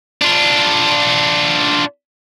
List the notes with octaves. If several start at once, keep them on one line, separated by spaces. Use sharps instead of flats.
D4 F4